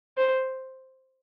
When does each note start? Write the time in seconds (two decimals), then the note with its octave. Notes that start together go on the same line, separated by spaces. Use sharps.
0.17 C5